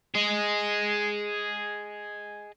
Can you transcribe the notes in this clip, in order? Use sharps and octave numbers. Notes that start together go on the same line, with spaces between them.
G#4 D#5